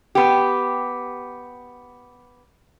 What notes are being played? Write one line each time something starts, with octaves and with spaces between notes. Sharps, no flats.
B3 G4